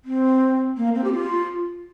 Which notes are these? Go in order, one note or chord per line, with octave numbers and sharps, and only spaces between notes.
C4
A#3
C4
G4
F4